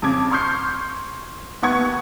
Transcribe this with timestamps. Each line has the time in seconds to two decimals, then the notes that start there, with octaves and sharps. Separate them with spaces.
0.02 F2 C#3 D6 G#6
0.31 C6 C#6 F6 G6 C7
1.62 D#2 B3 F#5 C#6 G#6